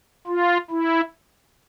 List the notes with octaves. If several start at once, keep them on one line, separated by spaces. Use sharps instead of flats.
F4
E4